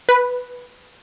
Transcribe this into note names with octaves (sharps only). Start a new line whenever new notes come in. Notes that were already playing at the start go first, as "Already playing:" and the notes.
B4